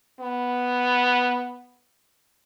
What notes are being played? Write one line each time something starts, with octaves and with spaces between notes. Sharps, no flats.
B3